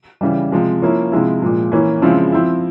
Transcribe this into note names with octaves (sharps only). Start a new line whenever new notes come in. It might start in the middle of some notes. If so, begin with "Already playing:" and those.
C#3 E3 G3
C3 F3 G#3
F3 A#3 C#4 E4
C3 F3 G#3 E4
A#2 F3 G#3
E3 A#3 C#4 E4
C#3 F3 G#3 C4 E4
F3 C4 E4